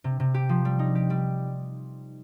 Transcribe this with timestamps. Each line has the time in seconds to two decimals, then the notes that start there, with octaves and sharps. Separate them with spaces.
0.04 C3
0.20 C3
0.34 G4
0.49 F3
0.65 G3
0.79 D#4
0.95 G4
1.10 G3